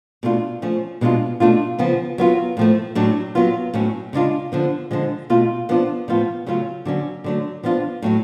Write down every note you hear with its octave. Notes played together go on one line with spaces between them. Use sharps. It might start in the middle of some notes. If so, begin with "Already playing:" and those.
B2 A3 D4 F4
F3 A3 C#4
B2 G#3 D4 F4
B2 A3 D4 F4
C#3 F3 B3 F4
F#3 B3 F4
A2 F3 A3
A2 F#3 A3 D4
F#3 B3 F4
A2 F#3 C#4
C#3 G#3 D4 F4
D3 F3 B3
D3 F3 G#3
B2 A3 F4
F3 B3 D4 F4
A2 F3 B3 F4
C#3 F#3 A3 C#4 F4
D3 F#3 C#4
D3 F#3 A3
F3 B3 D4 F4
A2 F#3 A3